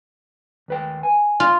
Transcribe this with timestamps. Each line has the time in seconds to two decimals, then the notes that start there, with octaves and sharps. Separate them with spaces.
0.68 D#2 B4 G5
1.03 G#5
1.40 F4